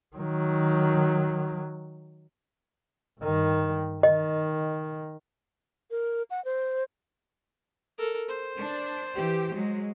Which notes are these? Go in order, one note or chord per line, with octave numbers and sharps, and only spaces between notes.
D#3 F#3
G2 D#3
D#3 D#5
A#4
F#5
C5
A4 A#4
C5
D4
E3 G4
F#3 G#3